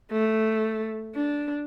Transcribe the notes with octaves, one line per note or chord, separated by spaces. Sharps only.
A3
D4